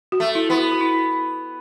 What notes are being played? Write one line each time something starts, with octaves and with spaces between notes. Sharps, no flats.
F#4
A3
E4
B3 E4
F#4
F#4
E4